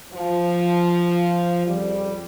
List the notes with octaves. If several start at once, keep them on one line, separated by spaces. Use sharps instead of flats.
F3
F2 C#3 G3